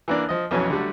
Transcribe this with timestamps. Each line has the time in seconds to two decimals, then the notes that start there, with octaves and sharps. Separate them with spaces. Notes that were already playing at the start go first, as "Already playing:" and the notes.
0.08 E3 A#3 D4
0.29 F3 D#5
0.51 B1 F2 E3 F#3 C#4
0.70 D3 F#3 G3 A3